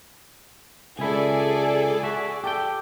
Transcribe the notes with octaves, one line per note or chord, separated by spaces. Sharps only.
C#2 E4 G#4 A4 D5
F#4 E5
G4 A4 G5